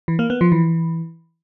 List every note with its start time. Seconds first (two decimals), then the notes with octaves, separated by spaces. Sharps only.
0.08 E3
0.19 A#3
0.30 B3
0.41 F3
0.52 E3